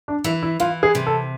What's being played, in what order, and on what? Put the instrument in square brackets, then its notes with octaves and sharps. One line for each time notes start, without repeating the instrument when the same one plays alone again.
[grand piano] D4
[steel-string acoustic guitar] E3 [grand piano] E4
[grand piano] E4
[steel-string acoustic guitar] E3 [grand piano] F4
[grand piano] G#4
[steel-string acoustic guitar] C3
[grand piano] A4